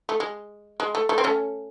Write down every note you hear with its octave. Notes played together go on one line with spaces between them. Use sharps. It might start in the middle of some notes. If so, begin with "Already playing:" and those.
A3
G#3
G#3
A3
A3
C4
A3 C#4